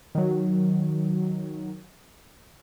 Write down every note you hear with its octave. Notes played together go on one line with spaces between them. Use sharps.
D#3 F#3